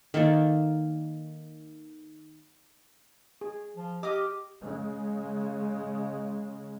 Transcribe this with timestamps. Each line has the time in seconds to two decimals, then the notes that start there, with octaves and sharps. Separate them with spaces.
0.14 D#3 A#3 A4 D5
3.41 G#4
3.76 F3
4.03 G4 D#5 D6 D#6 F6
4.62 C#3 G#3